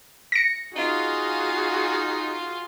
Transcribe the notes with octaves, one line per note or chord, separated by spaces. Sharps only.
A#6 C#7
D#4 F4 F#4 G#4 D#5 F5